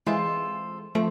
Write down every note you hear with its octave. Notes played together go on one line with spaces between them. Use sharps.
E3 G#3 C4 F4 A4
F3 A3 C4